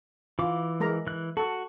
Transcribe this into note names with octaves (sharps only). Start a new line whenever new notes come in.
E3 F4 D6
G#3 A#4 A#5
E3 F#6
F#4 A4